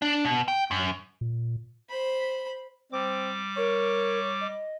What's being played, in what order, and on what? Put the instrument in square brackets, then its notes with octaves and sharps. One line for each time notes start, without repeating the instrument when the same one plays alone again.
[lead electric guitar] D4
B2
G5
F#2
[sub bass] A#2
[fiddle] C5 B5
[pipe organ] G3 D6 [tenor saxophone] C4
[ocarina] A#4 [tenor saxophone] C#5
[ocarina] D#5